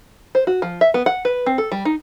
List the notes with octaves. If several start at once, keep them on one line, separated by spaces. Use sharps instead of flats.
C5
F#4
F3
E5
B3
F#5
B4
C4
A4
G3
D#4